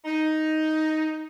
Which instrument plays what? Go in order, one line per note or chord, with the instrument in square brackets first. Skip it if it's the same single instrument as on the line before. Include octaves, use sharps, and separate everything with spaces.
[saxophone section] D#4